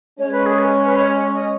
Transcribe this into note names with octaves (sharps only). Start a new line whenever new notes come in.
G#3 C#4 C#5
B4
G#4
B4
B4
C#5
D#5